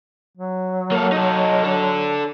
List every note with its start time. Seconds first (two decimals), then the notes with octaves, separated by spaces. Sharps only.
0.37 F#3
0.91 A#3 A4
1.12 D#4 A4
1.64 D4 A4